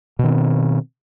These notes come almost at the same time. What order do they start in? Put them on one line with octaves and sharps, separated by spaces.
B2 D#3 C4